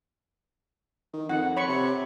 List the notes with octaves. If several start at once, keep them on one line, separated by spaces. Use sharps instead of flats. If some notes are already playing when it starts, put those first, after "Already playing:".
D#3
F2 F#5
C#5 B5 C#6
C3